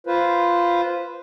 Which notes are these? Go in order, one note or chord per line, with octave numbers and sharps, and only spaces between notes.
F4 B4 C5